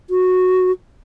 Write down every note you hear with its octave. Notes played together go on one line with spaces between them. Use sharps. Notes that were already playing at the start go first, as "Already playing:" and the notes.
F#4